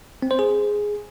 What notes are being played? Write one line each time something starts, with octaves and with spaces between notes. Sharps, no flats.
C4
C5
G#4